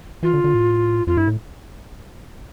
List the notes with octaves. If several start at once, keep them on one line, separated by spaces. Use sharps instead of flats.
E3 F4
D3
D3
A2
F2 F4
G2 E4
A2